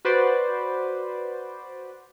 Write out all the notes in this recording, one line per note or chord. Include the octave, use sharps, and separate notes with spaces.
F#4 B4 C5 D5